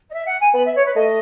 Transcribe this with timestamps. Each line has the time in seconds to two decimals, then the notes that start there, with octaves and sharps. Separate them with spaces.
0.09 D#5
0.14 E5
0.26 F#5
0.40 G#5
0.54 B3 B5
0.65 E5
0.75 C#5
0.86 B4
0.95 A3 D#5